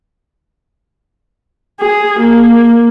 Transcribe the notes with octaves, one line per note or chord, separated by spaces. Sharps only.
G#4
A#3